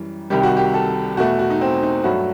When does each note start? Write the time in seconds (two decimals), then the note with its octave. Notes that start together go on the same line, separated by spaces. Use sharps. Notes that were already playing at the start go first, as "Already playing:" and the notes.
Already playing: F#2 E3 G3
0.30 C2 C3 D#3 G3 G4
0.43 F#4
0.57 G4
0.74 A4
1.17 E2 B2 A3 F#4
1.39 F#4
1.50 D#4
1.61 C4
1.82 D#4
2.04 G2 F#3 A3 F#4